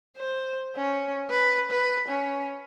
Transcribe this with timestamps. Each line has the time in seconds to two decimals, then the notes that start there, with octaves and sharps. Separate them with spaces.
0.18 C5
0.76 C#4
1.30 B4
1.71 B4
2.08 C#4